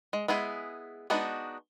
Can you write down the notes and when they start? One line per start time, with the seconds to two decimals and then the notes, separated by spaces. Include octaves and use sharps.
0.13 G#3
0.28 G#3 B3 E4 G#4
1.10 G#3 B3 D4 D#4 F#4